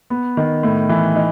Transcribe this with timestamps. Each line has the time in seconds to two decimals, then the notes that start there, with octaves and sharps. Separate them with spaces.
0.10 B3
0.37 D#3
0.63 A2
0.89 E3
1.16 D#4